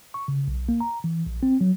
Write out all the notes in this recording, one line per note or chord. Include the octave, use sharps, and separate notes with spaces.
C#6
C#3
B1
A#3
A#5
E3
A#1
C4
F#3